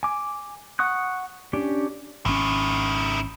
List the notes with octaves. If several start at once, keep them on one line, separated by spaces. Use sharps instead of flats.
G#5 D6
F#5 C#6 D#6 F#6
C#4 D4 G4
G#1 D#3 C#4 E4